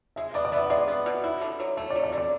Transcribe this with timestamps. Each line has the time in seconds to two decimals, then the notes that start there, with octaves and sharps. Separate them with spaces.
0.16 G#3 E5
0.34 B3 D5
0.45 D5
0.52 B3 E5
0.66 E5
0.70 G#3 D5
0.88 B3
1.06 B2
1.24 E4
1.41 D3
1.60 F#3
1.77 A3 C#5
1.90 D5
1.96 F#3
2.04 D5
2.12 D3
2.18 D5